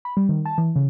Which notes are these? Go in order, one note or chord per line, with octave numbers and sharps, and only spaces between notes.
B5
G3
D#3
A5
E3
C#3